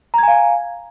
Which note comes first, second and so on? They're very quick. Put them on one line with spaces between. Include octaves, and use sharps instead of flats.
A#5 G#6 G#5 F5